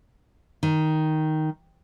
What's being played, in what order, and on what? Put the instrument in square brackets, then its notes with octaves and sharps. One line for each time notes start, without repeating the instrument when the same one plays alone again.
[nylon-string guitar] D#3